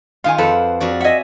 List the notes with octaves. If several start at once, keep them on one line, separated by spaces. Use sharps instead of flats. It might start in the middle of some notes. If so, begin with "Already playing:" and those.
D#3 F4 F5 G#5
F2 A4 B4 C5 F#5
F2 F#4 D5
D#5 E5 F#5 G#5